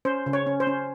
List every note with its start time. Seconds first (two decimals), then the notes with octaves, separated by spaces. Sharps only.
0.05 C#4 C5
0.26 C#3
0.33 C#5
0.47 C#4
0.60 C5
0.67 C#4